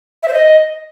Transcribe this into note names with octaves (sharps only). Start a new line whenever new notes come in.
E5
C5
D#5